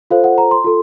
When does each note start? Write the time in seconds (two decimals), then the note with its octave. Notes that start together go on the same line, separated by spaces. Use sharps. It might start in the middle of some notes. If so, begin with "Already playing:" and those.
0.11 F4 A4 C5 F5
0.24 F#5
0.38 A#5
0.51 C6
0.64 F4 A4